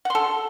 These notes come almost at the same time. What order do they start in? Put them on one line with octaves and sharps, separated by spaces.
F#5 C6 A4